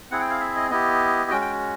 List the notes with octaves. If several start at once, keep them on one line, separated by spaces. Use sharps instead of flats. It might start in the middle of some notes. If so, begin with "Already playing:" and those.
C4 E4 G#4 F#5
G5
F5
E5
D#5
B3 E4 G4 D#5
G#3 C#4 F#4 G5
G5